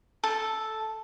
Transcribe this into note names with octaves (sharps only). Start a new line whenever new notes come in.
A4